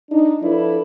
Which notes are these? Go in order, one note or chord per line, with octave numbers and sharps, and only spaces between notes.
D4 D#4
F3 D4 E4 A4 B4 D5